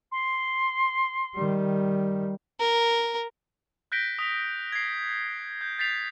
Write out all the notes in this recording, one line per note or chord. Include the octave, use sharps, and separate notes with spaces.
C6
D#3 G3
A#4
F#6 G6 A#6 B6 D7 G7
D#6 B6 F7
G#6 C7
G6
G6 A6 B6 C7 F7